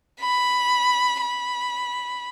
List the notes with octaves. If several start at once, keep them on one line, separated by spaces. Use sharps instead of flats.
B5
B5